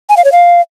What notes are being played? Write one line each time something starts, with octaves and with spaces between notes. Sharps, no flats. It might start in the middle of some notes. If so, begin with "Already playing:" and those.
G#5
F5
C#5
F5